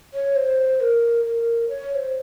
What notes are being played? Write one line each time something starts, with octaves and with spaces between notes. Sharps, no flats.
C#5
C5
A#4
A#4
C#5
C#5
C5